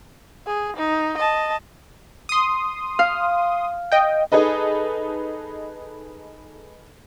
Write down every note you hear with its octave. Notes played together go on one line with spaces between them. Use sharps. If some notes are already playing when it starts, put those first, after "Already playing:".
G#4
D#4
D#5 A5
C6 D#6
F5
D#5 G5
D#4 G#4 A4 B4 D#5